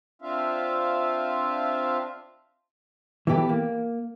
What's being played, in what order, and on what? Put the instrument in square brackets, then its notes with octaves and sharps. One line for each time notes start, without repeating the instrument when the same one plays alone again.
[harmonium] C4 D4 F4 E5 F5
[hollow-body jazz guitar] E3 B3 G4 A4
A#3